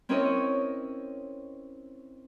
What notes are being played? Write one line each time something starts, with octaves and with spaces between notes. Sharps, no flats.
C4 C#4 E4 A#4 C#5 D#5